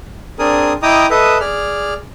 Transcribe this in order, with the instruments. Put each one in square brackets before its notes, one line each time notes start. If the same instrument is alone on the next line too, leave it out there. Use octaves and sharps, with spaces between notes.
[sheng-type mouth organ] C4 D4 G#4 A#4 D#6
E4 D#5 G5 A#5 D6 D#6
A4 B4 D#5 E5 D#6
G#4 D5 F6